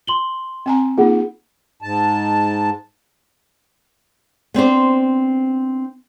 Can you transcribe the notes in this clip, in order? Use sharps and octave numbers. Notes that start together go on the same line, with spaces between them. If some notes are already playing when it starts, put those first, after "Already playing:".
C6 F#7 G7
C4 G#5 A#5
A#3 D#4 F4 G#4 F#5
G#2 A5
B3 C4 D4 C5